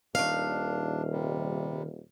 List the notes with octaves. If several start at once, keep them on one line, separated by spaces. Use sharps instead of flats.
D#1 D#3 D4 F5
C3 G3